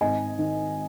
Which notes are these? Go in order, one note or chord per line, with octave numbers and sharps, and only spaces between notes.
G#1 D#5 G#5
D#3